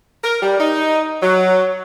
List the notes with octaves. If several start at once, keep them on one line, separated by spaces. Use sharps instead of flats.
A#4
G3
D#4
F#3